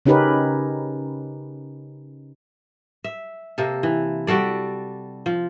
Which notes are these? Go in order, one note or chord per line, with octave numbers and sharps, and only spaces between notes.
C#3 C#4 D#4 G4 A#4 B4
E5
C3 A#3 A4
E3
G3 F#4 A4 D5
F3